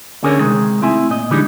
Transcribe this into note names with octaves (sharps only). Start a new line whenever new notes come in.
D2 D3 C#4 G#4 A#4 C#5
C3 D#3 G#3
A3 C4 E4 E5 G#5
A#2 D#5
D3 E3 G3 G#3 D4 D#4